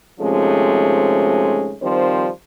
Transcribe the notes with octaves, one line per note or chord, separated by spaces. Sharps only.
C3 D#3 F3 G#3 A3 C#4
D#3 F3 G3 C4 C5